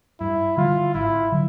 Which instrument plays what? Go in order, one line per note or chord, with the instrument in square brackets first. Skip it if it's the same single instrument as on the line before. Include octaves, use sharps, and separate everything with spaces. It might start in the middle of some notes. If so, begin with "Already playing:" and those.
[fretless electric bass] G2 [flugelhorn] E4
[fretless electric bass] D3 G3 [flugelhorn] F4
[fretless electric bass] G#1 [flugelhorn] E4
[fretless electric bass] D3 F#3